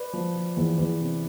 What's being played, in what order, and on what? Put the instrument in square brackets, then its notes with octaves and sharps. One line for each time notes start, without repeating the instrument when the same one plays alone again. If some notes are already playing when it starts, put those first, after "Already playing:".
Already playing: [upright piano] B4 D5
F3
F3
E2
E2
C3